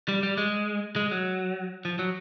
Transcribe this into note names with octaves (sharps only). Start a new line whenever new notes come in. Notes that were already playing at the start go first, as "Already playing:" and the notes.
G3
G3
G#3
G#3
F#3
F3
F#3